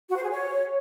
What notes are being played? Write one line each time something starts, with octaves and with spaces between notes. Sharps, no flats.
F#4
C5
G#4
C#5